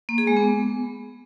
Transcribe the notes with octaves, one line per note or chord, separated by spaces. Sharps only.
A#3
G#4
G#3
B3